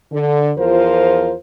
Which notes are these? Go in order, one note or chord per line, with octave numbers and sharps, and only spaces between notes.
D3
E2 F3 F4 A#4 C5